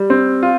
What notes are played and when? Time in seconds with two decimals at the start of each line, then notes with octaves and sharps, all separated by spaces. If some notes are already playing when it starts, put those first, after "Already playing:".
Already playing: G3
0.10 C4
0.43 F4